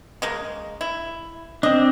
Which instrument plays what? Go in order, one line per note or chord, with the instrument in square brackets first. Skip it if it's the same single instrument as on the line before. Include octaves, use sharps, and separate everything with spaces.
[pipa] C#3 G#3 A#3
E4
[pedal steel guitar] C4 D4 [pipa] D#5